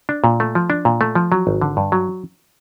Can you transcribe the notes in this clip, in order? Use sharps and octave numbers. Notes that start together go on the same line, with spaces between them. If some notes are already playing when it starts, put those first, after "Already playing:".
D4
A#2
A3
F3
D4
A#2
A3
F3
F#3
G#1
D3
G2
F#3